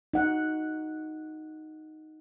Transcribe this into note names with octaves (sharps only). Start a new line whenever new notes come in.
D#4 F#5